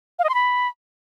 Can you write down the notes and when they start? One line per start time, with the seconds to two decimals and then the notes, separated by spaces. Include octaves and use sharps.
0.19 F5
0.24 D#5
0.29 C6
0.34 B5